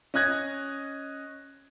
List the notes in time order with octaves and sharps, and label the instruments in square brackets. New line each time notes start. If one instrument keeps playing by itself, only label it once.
[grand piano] C#4 D#5 F#6 G#6 A#6